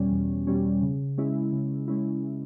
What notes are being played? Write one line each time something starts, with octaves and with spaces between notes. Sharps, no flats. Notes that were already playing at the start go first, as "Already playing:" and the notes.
Already playing: E2 B2 G3 C#4
E2
B2 G3 C#4
C#3
G#3 C#4 E4
C#3
G#3 C#4 E4